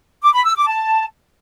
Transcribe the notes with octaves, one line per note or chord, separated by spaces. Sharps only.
D6
B5
E6
D6
A5